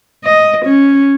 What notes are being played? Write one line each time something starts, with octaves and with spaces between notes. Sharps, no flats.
D#5
C#4